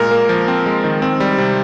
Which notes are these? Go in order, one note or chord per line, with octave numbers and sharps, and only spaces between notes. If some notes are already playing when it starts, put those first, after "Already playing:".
Already playing: A#2 G#3 A#4
A#3
F3
C4
G#3
D#3
C4
G3
C3